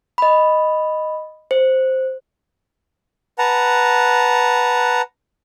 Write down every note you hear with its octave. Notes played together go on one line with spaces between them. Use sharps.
D#5 B5
C5
B4 F#5 A5 A#5